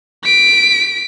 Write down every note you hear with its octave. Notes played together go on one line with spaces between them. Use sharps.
B6 D7